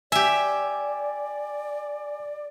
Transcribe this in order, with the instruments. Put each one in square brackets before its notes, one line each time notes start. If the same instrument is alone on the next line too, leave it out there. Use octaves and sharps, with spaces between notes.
[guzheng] G4 E5 [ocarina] D5 [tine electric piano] G#5